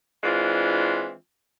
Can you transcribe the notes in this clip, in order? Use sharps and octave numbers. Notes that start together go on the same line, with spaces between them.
E3 G#3 C4 D4 F4